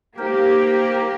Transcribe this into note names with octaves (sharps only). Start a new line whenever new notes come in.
A#3 D#4 G4 A#4 C5